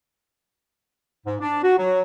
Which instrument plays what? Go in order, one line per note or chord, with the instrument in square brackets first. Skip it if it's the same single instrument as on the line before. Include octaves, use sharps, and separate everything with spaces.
[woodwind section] G#2
D4
F#4
F#3